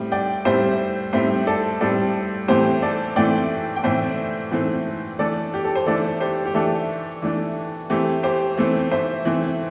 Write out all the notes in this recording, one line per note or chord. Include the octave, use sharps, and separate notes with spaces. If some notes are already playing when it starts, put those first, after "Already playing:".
Already playing: A2 G3 C4
D5 G5
A2 G3 C4 C5 E5
A2 G3 C4 C5 E5
A4 D5
A2 G3 C4 A4 D5
A2 E3 A3 C4 G4 C5
A4 D5
A2 E3 A3 C4 D5 G5
G5
A2 E3 A3 C4 C5 E5
A2 E3 A3 C4
E3 A3 D4 A4 D5
G4
A4
C5
E3 A3 D4 A4 D5
G4 C5
G4
E3 A3 D4 A4
E3 A3 D4
E3 A3 C4 G4
G4 C5
E3 A3 C4
C5 E5
E3 A3 C4